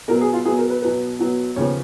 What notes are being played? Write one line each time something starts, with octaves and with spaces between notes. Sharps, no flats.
B2 F#3 B3 A#4
G#4
F4
B2 F#3 B3 G#4
A#4
B4
B2 F#3 B3 B4
B2 F#3 B3
D#2 C#3 F3 B3 C#5